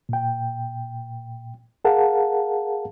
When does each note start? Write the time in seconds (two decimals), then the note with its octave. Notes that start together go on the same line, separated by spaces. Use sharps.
0.09 A#2 G5
1.85 G#4 A#4 F5 F#5 A5 A#5